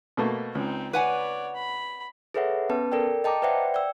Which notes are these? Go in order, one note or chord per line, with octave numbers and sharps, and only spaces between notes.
B2 A3 A#3
C#2 C4 D#4
B4 C#5 D5 F#5 G#5
B5
G#4 A4 B4 C#5 E5 F#5
B3 C#4 B4 A5
A4 A#4 D5 G5
D#5 G5 A5 A#5 D6
B4 C5 D5 E5 F#5 G5
D5 G5 E6